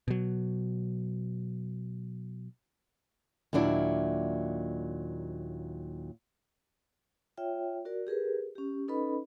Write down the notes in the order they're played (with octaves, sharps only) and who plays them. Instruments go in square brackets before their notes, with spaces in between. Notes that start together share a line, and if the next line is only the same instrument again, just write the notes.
[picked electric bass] B2 F#3
[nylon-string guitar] D#2 A#2 F#3 D4 E4
[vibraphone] F4 C#5 E5 G5
F#4 A#4 D5
G4 G#4 A#4 B4
C#4 G4
C#4 D#4 A4 B4 D#5 B5